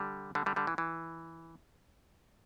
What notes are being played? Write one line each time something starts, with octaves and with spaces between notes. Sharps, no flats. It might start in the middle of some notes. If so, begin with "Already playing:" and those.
Already playing: D3 G3
D3 G3
D3 G3
D3 G3
E3
E3